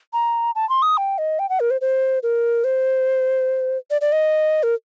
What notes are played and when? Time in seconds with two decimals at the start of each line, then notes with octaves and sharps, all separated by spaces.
0.13 A#5
0.55 A5
0.70 C6
0.82 D#6
0.97 G5
1.18 D#5
1.39 G5
1.49 F#5
1.60 A#4
1.71 C5
1.81 C5
2.23 A#4
2.64 C5
3.91 D5
4.01 D5
4.12 D#5
4.63 A#4